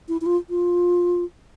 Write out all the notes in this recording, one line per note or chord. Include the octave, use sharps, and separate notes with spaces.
E4
E4
F4
F4